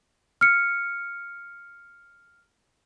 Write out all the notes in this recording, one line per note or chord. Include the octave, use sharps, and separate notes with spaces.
F6 C#7